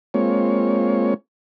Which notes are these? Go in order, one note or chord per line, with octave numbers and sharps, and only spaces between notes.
G#3 A#3 C4 F4 C#5